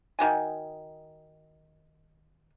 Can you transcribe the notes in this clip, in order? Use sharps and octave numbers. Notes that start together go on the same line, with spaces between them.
D#3 F#4 G#5